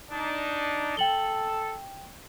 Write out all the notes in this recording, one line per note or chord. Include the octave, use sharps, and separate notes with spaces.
D4 D#4
A4 G5 F#7 G7